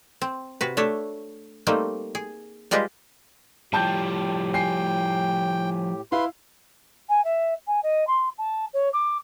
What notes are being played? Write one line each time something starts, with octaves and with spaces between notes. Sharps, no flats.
C4
C3 F#4 B4
A3 D4 C#5 E5
G3 A3 A#3 C4 D#4
G#4
G3 G#3 F4 G4 B4 D#5
A2 F3 G3 G4 G5 A5 G6
G5 G#5 C7
E4 B4 F5 C6
G#5
E5
G#5
D#5
C6
A5
C#5
D6